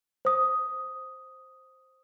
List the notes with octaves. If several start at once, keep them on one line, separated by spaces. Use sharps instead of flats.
C5 D#6